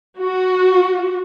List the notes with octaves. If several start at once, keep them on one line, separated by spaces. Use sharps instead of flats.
F#4